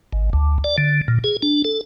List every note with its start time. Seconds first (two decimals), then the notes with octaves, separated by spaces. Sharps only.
0.13 G#1
0.33 D2
0.64 D5
0.78 D3
1.08 A#2
1.24 G#4
1.42 D4
1.65 A4